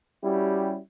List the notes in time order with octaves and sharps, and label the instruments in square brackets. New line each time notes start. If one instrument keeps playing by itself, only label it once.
[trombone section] G3 C#4 E4 F#4 G4